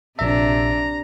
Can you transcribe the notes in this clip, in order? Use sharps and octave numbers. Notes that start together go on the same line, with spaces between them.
A#1 C3 D4 E5 A#5